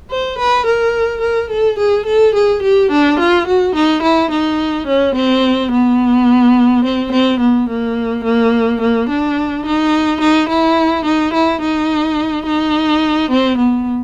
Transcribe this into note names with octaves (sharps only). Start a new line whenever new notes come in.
C5
B4
A#4
A#4
A4
G#4
A4
G#4
G4
D4
F4
F#4
D#4
E4
D#4
C#4
C4
B3
C4
C4
B3
A#3
A#3
A#3
D4
D#4
D#4
E4
D#4
E4
D#4
D#4
C4
B3